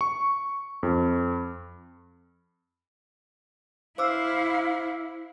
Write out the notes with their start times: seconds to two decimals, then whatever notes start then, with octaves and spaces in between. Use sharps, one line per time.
0.01 C#6
0.83 F2
3.98 E4 C5 F5 D6 E6